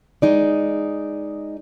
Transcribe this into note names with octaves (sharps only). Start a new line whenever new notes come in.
G#3 D#4 D5